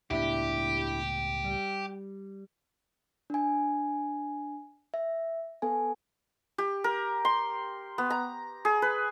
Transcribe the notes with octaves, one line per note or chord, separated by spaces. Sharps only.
C#2 A2 B3 D4 E4 G4
G3
D4 G#5
E5
B3 A4 G#5
G4
A#4
C6
B3
A#5
G#4
B4